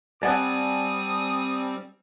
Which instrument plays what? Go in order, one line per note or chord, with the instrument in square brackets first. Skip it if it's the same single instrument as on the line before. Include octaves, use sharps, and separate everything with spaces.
[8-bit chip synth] G3 C4 [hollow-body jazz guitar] D5 F#5 [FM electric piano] G#5 A5 [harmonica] D#6